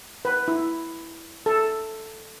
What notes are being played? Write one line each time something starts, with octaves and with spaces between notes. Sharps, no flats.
B4
E4
A4